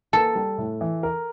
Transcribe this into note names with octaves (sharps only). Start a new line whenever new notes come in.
A#3 A4
G3
A2
E3
A#4